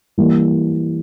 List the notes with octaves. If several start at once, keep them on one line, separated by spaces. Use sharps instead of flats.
E3 G3 A#3